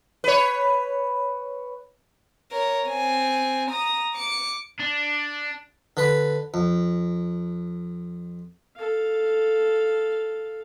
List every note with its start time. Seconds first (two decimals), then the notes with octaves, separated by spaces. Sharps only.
0.24 B4 C#5
2.51 A#4 C#5
2.88 C4 G#5
3.70 A#5 D#6
4.15 D6 C#7
4.80 D4
5.97 D3 B4 B5
6.54 F2
8.77 A4 F5